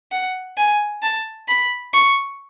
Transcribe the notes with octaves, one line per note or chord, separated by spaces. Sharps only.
F#5
G#5
A5
B5
C#6